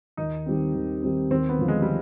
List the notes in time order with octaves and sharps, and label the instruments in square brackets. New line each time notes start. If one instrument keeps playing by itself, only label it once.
[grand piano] D#2 [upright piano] D#4
[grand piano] D#3 G3 C4
D#2
D#3 G3 C4
[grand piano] D#2 [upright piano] C4
[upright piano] B3
[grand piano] D3 F3
[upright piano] G#3
G3